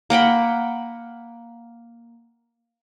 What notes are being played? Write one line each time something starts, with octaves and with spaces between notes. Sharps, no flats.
A#3 F#5 G5 B5